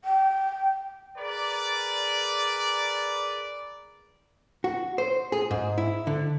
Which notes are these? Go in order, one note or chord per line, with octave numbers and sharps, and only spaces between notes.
G5
G#4 A#4 B4 D5
F#4
C5
G#4
G#2
E4
D3